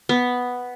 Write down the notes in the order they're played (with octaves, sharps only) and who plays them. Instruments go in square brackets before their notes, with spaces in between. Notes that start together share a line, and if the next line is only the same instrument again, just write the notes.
[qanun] B3